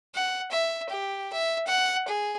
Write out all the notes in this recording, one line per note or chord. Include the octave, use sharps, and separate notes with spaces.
F#5
E5
G4
E5
F#5
G#4